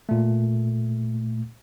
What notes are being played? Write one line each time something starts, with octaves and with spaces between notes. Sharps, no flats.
A#2 A3